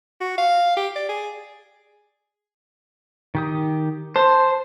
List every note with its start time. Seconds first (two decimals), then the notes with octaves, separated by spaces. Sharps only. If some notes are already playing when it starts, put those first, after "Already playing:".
0.21 F#4
0.38 F5
0.77 G4
0.96 D5
1.09 G#4
3.35 D#3 G4 D#6
4.16 C5 A5